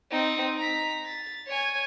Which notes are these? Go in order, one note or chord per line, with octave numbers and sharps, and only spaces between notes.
C4 D#4
A#5 B6
A6
C#5 G#5